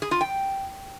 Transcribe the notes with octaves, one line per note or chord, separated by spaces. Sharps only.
G#4
F4
G5